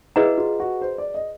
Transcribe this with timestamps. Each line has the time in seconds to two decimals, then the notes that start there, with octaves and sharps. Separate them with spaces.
0.16 E4 G#4 B4 D#5 F#5 A#5
0.38 F4
0.60 F#4
0.82 C5
0.98 D5
1.14 D#5